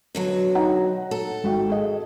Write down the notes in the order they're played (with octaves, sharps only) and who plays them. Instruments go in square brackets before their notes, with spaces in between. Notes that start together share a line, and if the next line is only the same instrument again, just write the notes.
[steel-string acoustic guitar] B2 D3 F#3
[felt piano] D#4 F#5 A#5
[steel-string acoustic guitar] A4
[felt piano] G#1 F#4 G5
G#4 D#5